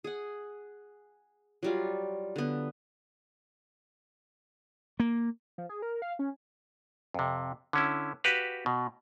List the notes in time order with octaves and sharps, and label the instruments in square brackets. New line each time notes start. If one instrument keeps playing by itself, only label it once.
[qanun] G#4 F#5
F#3 G3 F4
D3 B3
[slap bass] A#3
[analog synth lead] F3
G#4
A#4
F5
C#4
[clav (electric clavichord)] F2 C3
D3 C#4 E4
F#4 G4 B4 F5
B2